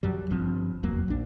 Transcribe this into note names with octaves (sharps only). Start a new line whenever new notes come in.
F#2 F#3 G3
G1 G2 F3 C4
F1 E2 F#3 A#3
A#1 D4